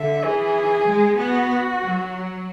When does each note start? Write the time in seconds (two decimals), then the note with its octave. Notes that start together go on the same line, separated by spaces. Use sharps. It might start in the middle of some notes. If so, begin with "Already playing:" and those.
Already playing: D3 E5
0.24 E3 G#4
0.87 G#3
1.18 B3 F#4
1.82 F#3